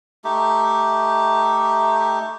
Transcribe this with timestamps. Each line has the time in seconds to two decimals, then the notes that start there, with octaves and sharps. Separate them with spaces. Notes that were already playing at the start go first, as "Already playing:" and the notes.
0.24 A3 D#4 G4